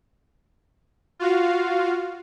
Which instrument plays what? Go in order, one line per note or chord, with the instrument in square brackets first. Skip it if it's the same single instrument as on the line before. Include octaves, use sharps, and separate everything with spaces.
[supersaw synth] F4 F#4 F5